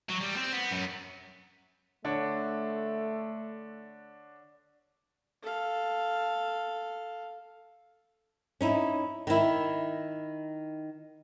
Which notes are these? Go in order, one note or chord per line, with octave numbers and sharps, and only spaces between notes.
F#3
G3
C4
B3
F#2
D3 A3 D4 C#5
A4 F5
C#4 D#4 E4
D#3 E4